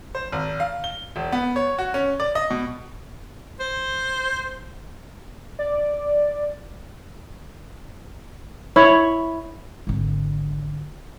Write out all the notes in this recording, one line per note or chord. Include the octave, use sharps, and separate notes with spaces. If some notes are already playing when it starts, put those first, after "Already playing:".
C5
G#1
F5
G7
E1
B3
C#5
F#4
C#4
D5
D#5
B2
C5
D5
E4 C#5
G#1 D3